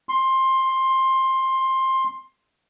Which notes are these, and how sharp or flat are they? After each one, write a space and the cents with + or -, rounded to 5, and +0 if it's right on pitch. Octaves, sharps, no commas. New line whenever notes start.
C6 +15